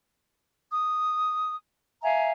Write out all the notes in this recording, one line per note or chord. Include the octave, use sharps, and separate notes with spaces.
D#6
E5 F5 G#5 A#5